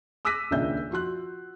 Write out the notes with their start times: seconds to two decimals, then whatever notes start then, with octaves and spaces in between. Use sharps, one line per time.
0.25 D6 E6 F#6 A#6 B6 D#7
0.51 D#1 C#2 A#2 D4 E5 G6
0.91 F3 F#4 C6 F#6